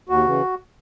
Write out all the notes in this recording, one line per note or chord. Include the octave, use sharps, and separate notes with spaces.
D#2 F#4
C#3 E3